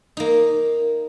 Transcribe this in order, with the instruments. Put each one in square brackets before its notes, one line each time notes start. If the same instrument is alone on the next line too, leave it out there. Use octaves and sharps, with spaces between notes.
[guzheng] A#3 D#4